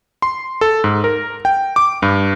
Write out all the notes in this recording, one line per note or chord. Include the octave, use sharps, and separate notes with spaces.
C6
A4
G#2
A#4
G5
D6
G2